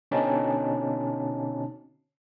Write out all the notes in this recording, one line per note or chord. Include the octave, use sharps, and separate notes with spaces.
B2 D3 C4 C#4 D#4 A5